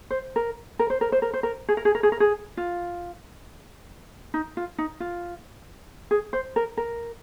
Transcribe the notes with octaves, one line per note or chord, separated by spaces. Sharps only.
C5
A#4
A#4
C5
A#4
C5
A#4
C5
A#4
G#4
A#4
G#4
A#4
G#4
A#4
G#4
F4
D#4
F4
D#4
F4
G#4
C5
A#4
A#4